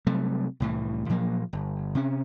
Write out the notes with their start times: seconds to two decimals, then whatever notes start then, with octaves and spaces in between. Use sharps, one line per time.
0.07 C3 F#3 G3 A3
0.60 C2 A2 E3
1.09 A#2 F3 F#3 A#3
1.53 G1
1.95 C3 C#4